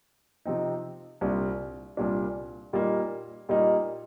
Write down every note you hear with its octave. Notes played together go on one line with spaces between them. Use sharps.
C3 F3 C4 D#4
C2 A#2 G3 D4
C2 A#2 G3 D4
A#2 G3 A#3 D#4
A#2 G3 A#3 D#4